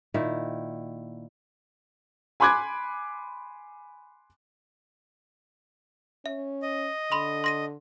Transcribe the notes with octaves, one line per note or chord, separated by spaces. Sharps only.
A#2 D#3 E4
G#5 B5 C6 D6 F#6 G#6
C#4 E5
D#5
D3 B5 C6
C6 A#6 D#7